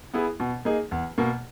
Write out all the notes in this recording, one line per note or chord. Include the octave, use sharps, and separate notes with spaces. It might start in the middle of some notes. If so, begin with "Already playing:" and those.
B3 E4 G#4
B2
A#3 D#4 G#4
E2
B2 A#3